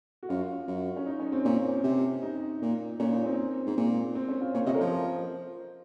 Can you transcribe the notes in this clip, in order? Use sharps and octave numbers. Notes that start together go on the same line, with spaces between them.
F#4
F#2 F4
F#2
C#4
D#4
C#4
C4
A#2 C#4
C3
D#4
A#2
A#2 C#4
D#4
C4
G#2
A#2
C4
C#4
F4
A#2 C#5
C3 D#5
A#4
F3 C5